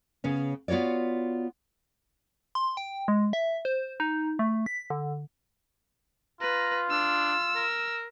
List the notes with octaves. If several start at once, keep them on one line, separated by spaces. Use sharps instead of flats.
C#3 B3 C#4
B3 F4 F#4 C#5 D5
C6
G5
G#3
E5
C5
D#4
A3
B6
D3
F4 B4 A#5
D4 E6
A#4